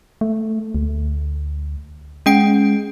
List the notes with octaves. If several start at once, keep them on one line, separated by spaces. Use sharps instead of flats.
A3
D2
G#3 C#4 G5 D7